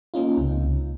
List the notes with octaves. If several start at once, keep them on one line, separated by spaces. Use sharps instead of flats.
A#3 C#4 D#4 F4
C#2 C3